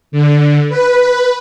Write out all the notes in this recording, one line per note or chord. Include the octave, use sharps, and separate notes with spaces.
D3
B4